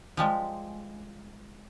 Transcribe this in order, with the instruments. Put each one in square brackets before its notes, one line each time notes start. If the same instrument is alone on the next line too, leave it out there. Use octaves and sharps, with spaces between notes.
[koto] F3 G3 G#3